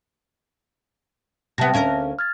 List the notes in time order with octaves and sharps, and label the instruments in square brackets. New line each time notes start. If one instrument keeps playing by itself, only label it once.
[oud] C3 B3 [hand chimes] E5 A5 A#6
[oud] D2 C#4 A#4 [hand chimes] F5
[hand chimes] F6 G#6 A6